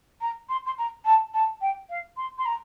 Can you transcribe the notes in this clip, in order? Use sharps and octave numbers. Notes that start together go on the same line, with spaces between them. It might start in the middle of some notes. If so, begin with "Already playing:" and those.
A#5
C6
C6
A#5
A5
A5
G5
F5
C6
C6
A#5